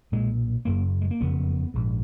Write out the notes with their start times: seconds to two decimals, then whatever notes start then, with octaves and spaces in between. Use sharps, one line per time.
0.12 B1 A#2 G#3
0.65 F#1 F#2 C#3 A#3
1.02 G#3
1.11 A#3
1.21 F#1 F2 C#3 B3
1.74 A#1 G#2